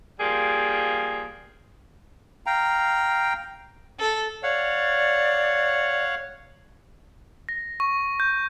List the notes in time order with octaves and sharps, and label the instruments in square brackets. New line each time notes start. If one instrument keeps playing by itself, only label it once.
[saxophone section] F3 G3 A#3 G#4
[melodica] F5 G5 A#5
[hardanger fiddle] A4
[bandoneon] C#5 F5 F#5 [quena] D5
[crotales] A#6
C#6
G6